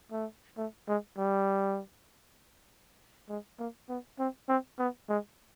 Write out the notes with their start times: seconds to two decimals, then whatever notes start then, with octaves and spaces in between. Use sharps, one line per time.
0.12 A3
0.57 A3
0.88 G#3
1.18 G3
3.29 G#3
3.59 A#3
3.89 B3
4.19 C4
4.49 C4
4.79 B3
5.09 G#3